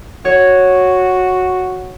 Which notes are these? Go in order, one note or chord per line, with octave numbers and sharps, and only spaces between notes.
F#4 C#5